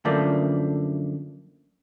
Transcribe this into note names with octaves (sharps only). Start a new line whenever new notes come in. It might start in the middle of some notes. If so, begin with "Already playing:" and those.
F#2 D3 F3 A3 A#3 D4